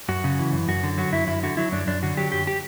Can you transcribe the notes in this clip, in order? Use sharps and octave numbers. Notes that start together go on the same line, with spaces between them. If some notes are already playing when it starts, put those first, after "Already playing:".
F#2 F#4
C#3
E3
F#2
F#2 F#4
D3
F#3 F#4
F#2 E4
F#2 E4
D3 F#4
F#3 E4
F#2 D4
F#2 D4
D3 F#4
F#3 G4
F#2 G4
G4